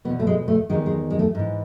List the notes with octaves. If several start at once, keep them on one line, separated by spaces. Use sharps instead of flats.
E2 B2 B3
A3
G#3
A3
E2 D#3 G#3
G#3
G#3
A3
G#2 E3